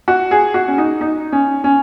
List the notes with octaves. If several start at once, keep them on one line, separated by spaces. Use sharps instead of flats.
F#4
G#4
F#4
C#4
D#4
D#4
C#4
C#4